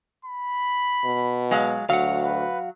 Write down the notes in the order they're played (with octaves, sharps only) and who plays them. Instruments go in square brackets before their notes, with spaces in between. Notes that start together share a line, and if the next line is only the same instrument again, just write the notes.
[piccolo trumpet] B5
[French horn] B2
[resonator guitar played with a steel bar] F#3 G#3 F5
[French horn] D2 [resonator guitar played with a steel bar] F#3 [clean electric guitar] F5 F#5
[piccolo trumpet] B4